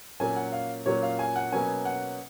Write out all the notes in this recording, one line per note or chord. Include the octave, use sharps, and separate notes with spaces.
A#2 F#3 A#3 C#4 G#5
F#5
F5
A#2 F#3 A#3 C#4 C#5
F5
G#5
F#5
B2 F#3 A#3 C#4 G#5
F#5